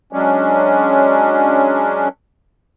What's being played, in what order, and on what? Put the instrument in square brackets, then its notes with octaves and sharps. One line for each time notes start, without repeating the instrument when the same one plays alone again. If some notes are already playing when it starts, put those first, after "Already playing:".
[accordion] F#3 G#3 C#4 D4